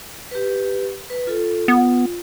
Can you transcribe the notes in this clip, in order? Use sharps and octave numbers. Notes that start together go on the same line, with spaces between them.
G4 B4
B4
F4 A4
B3 F4